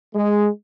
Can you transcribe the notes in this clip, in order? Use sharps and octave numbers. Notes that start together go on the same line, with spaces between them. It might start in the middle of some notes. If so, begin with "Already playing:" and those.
G#3